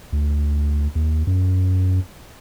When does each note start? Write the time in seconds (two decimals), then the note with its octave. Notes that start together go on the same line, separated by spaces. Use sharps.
0.13 D2
0.95 D#2
1.27 F#2